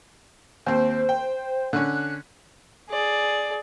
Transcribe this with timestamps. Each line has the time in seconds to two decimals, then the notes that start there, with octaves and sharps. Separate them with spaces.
0.67 D#2 C4 C5
1.09 G5
1.73 D3 C#4 F#6
2.90 G#4 D5